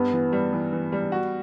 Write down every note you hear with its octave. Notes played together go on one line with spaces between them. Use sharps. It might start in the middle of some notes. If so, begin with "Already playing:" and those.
Already playing: G2 B3
E3
G3
E3
E3
G3
F#4